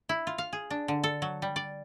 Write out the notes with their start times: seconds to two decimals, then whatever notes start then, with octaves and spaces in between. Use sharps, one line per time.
0.09 E4
0.27 F4
0.38 F5
0.53 G#4
0.71 D4
0.88 D3
1.04 A4
1.22 F#3
1.42 G3
1.56 D5